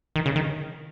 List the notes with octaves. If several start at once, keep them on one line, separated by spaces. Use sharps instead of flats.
D#3
C#3
D#3